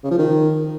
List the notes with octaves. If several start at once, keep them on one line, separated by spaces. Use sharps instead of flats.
C#3
F3
D#3